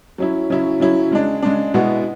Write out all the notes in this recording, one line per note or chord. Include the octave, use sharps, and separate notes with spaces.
F#3 C#4 E4
C#3 F#3 C#4 E4
C#3 F#3 C#4 E4
C#3 G#3 D4
C#3 G#3 D4
B2 G#3 B3 E4